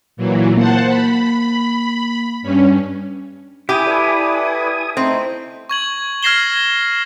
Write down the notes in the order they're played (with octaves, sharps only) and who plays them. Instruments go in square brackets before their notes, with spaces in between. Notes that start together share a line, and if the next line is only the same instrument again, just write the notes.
[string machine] A#2 E3 F#3
[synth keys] A#3 [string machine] C5 F#5 A5
[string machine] B5
G2 C#4
[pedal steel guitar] E4 [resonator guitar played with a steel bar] G4 [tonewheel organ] G#5 D#6
[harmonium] A4 B4 D5
[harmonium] A3 D#4 [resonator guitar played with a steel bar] C4
[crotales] C#6 G#6 F#7
F6 G#6 A#6 C7 E7 G7